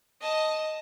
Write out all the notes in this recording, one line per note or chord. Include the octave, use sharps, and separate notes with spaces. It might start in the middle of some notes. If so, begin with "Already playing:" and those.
D#5 A5